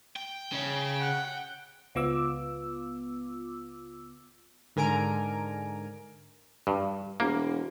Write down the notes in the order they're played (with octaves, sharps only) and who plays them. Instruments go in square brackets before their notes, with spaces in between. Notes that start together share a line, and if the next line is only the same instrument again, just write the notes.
[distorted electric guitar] G5
[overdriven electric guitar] C#3 C#4
[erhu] F#5
[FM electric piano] C#2 B3 F4 D6 E6
[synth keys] G#2 D3 A#4 G#5 A#5 D7
[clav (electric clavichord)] G2
[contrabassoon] E1 [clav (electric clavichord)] A#3